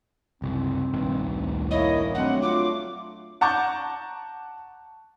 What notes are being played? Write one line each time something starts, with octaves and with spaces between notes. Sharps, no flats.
F#1 C2 C4
A#1 G2 D#3
D2
A#3 E4 C#5 D#5
F#3 A3 C4 D4 F#5
F4 D6
F#5 A5 A#5 C#6 D6 G6